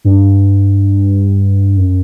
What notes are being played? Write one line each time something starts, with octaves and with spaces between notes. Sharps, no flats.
G2
F#2